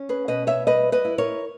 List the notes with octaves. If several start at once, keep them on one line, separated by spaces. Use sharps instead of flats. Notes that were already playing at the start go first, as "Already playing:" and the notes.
Already playing: C#4
G#4 B4
B2 B4 D#5
C#5 E5
G3 B4 D#5
B4 D#5
E4
A#4 C#5